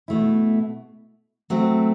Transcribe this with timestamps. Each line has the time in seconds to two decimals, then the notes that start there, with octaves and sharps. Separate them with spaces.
0.08 B2 A3 E4
1.50 F#3 A3 C4